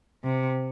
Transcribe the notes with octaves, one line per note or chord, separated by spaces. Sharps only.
C3